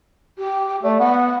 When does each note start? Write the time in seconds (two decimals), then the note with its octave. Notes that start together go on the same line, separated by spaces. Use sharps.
0.38 G4
0.83 A3 D5
0.99 B3 F#5